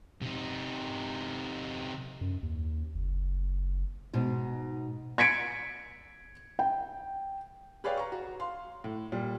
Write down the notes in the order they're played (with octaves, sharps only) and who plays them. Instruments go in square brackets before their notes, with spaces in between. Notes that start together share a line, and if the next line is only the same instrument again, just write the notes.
[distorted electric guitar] C3 D#4
[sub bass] F#2
D#2
F#1
[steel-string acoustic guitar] G#2 B2 D#4
[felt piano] G#6 B6 C#7 D7
G5
G#4 B4 C#5 D5 F5 G5
A#5 C#6
F#4
F5 C6
A2
A#2 G3